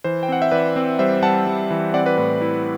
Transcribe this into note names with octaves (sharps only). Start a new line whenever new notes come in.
E3 C5
G5
C4 F#5
E5
E3 B4 D5
C4
G3 C5 E5
G3 F#5 A5
G3
E3
C4 D5 F#5
B4 D5
A2 B4
E4